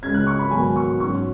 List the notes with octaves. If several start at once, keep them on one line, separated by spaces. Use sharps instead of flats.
C#2 C#3 G#3 C#4 G#6
F#6
C#6
B5
G#2 D#3 F#3 B3 G#5
C#6
G#2 F#3 C#4 C#6